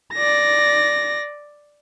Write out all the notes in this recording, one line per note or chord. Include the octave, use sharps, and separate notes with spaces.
D5 A#6